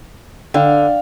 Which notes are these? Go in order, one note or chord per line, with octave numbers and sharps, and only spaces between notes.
D3 F5 G5